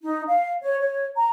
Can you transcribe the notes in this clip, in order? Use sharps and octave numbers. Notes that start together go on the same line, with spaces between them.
D#4
F5
C#5
C#5
A#5